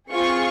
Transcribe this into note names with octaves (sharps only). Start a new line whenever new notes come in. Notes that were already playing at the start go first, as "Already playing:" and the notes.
C4 F4 G#4 C#6